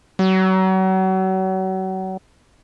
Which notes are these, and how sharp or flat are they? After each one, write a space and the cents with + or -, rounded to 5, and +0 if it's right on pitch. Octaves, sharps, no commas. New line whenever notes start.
F#3 +35